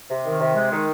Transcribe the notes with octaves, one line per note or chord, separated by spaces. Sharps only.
C3
D#3
C3
G#3
D#3